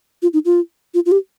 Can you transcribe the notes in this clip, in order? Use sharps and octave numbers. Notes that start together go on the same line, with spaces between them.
F4
D#4
F4
F4
F4
G4